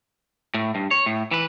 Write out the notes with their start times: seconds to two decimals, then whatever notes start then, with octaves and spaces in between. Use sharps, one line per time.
0.54 A2
0.75 G2
0.91 C#5
1.06 A2
1.31 E3 B4